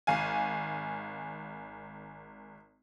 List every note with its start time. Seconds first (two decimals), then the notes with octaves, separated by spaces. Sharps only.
0.07 G#1 F5 G#5